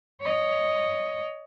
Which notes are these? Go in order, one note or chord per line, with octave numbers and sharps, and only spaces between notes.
C#5 D#5